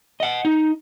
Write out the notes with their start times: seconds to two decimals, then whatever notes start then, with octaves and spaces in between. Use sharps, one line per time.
0.20 D#5 F#5
0.45 D#4